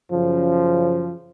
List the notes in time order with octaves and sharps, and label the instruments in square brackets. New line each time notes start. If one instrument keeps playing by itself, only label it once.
[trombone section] F#2 C#3 F3